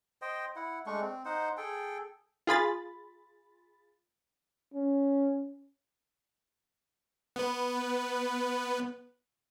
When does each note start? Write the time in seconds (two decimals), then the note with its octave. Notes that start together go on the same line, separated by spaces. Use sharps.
0.22 C5 D#5 G5
0.56 E4 F#5
0.86 G#3 A3 D4 C#6
1.01 C4
1.25 D#4 C5 F#5
1.57 G#4 A4 G5
2.47 F4 G#4 B5 A6
4.74 C#4
7.36 B3 B4